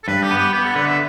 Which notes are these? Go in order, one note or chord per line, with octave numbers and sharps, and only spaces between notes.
A4
G2 B4
G4
B3
G4
B3 G4
A4
D3 B4
E5